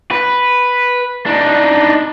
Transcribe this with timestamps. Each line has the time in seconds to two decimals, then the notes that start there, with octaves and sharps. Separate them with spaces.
0.11 B4
1.26 D4 D#4